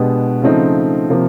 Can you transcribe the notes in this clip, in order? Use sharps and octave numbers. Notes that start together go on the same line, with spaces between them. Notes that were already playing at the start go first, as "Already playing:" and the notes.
Already playing: B2 G#3 B3 D4 G4
C#3 F3 A3 C4 D#4
C3 F3 A#3